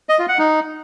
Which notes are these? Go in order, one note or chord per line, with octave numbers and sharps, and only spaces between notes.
D#5
F4
F#5
D#4